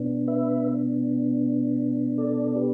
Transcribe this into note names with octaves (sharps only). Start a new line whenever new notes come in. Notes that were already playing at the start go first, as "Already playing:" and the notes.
Already playing: B2 B3 D4
B4 E5
A4 D5
G4 B4